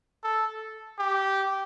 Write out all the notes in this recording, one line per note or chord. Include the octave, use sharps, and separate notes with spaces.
A4
G4